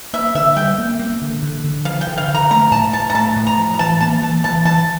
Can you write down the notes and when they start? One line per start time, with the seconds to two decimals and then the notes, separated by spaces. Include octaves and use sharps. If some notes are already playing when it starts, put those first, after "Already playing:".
0.13 A#3 E5
0.35 D3 E5
0.56 G3 G5
0.78 A#3
0.99 A#3
1.22 D3
1.42 D3
1.64 D3
1.85 F3 F5
2.01 G5
2.07 D3
2.18 F5
2.28 D3
2.34 A#5
2.51 A3 A#5
2.71 A2 A5
2.93 A2 A5
3.10 A#5
3.14 A3 A5
3.36 A2
3.47 A#5
3.58 F3
3.74 A#5
3.79 E3 A5
4.00 A#3 A5
4.22 E3 A5
4.44 E3 A5
4.65 E3 A5